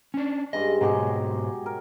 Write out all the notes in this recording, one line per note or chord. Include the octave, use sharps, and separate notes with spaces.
C#4 D4
G2 G#3 D#5
G#2 B2 F#3 G#3 G4 G#4
A#4